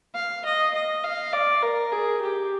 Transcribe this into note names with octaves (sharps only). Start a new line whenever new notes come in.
F5
D#5
D#5
F5
D5
A#4
G#4
G4